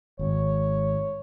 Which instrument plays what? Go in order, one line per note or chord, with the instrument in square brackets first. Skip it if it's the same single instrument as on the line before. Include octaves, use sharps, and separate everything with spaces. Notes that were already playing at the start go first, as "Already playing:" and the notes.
[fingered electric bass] G#1 [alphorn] C#5